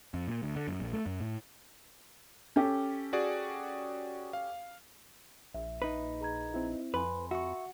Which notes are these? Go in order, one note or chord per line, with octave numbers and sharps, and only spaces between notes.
F2
A#2
D2
D3
F#2
A#1
A3
F#2
A2
C#4 G4 A4
F#4 G#4 D5
F5
A#1 E5
D#4 B4
G#4 A#5 G#6
C4 E4
F2 B4 G#5 B5 C6
F#4 E5 C#6